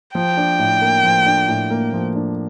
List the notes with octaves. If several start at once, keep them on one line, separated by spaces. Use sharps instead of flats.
F3 G5
D4
A2
A#3
F3
D4
A2
A#3
F3
D4